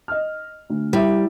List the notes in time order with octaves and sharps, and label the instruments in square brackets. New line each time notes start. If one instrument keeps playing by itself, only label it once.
[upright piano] D#5 F6
D2
[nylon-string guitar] G3 [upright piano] E4 E5